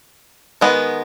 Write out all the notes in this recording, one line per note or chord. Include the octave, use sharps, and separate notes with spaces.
D#3 G#3 B3